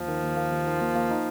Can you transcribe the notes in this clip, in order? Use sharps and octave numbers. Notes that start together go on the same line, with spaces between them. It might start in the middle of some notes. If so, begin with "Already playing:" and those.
Already playing: D#2 F3
D#3
D#2
A#3
D#2
D#3
D#2
A#3
D#4